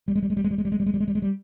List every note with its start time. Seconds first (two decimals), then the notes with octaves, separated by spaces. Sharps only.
0.08 G3
0.16 G#3
0.23 G3
0.30 G#3
0.37 G3
0.44 G#3
0.51 G3
0.58 G#3
0.65 G3
0.72 G#3
0.80 G3
0.86 G#3
0.94 G3
1.00 G#3
1.08 G3
1.15 G#3
1.22 G3